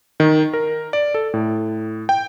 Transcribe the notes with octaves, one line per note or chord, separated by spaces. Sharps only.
D#3
A#4
D5
A4
A2
G5